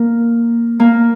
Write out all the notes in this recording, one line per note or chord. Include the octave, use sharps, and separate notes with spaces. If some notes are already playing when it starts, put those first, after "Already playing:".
Already playing: A#3
A#3